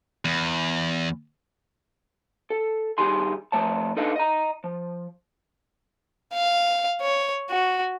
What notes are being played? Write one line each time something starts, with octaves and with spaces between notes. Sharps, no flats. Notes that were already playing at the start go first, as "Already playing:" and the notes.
E2
A4
G2 D#3 G4 G#4 G#5 C6
F3 A3 C#5 A5
D4 D#4 A4 B4 D#5 F5
D#5 A#5
F3
F5
C#5
F#4